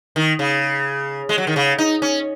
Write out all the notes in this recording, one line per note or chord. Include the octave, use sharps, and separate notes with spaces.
D#3
C#3
G#3
F#3
D#3
C#3
D#4
C#4